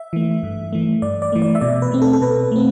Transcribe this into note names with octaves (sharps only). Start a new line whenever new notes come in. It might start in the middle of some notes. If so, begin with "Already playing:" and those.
Already playing: E5
E3 A3
G2
E3 A3
G2 D5
D5
E3 A3
D5
E5
B2 D5
B4
A3 C4
A4
A4
B2 B4
A3 C4